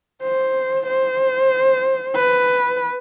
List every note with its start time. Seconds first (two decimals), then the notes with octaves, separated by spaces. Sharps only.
0.23 C5
0.87 C5
2.16 B4